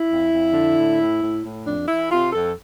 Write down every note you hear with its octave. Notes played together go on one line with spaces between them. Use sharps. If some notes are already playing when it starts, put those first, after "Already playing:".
Already playing: E4
F2
F2
D3
A2
A2
A2
A2
F2 D4
E3 E4
C3 F4
F2 A4